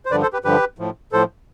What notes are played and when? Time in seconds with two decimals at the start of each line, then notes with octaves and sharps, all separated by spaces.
0.05 C5
0.10 G2 D3 F3 B4 D5
0.22 A4 C5
0.33 G4 B4
0.44 G2 D3 F3 G4 B4
0.78 A2 F3
1.12 A2 F3 A4 C5